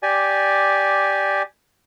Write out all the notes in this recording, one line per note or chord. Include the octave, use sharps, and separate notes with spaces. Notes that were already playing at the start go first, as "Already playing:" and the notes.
G4 D5 G#5